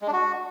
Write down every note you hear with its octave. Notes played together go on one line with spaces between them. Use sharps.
G#3
D4
F#4